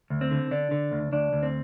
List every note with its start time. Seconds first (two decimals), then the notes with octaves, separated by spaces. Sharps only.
0.10 D2
0.21 C4
0.31 D3
0.51 D3 D4
0.71 D3
0.92 D2
1.12 D2 D4
1.33 D2
1.43 C4